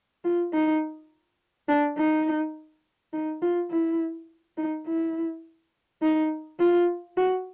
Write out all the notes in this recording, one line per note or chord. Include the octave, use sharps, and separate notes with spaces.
F4
D#4
D4
D#4
D#4
F4
E4
D#4
E4
D#4
F4
F#4